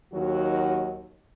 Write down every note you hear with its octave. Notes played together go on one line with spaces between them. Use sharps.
D#2 D#3 F#3 F#4